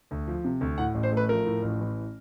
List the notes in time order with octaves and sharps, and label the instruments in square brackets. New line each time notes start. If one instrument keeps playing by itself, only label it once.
[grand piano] D2
F3
C3
D2
A2 F#5
A1
C5
A3
B4
F3 A#4
A2
A1
E3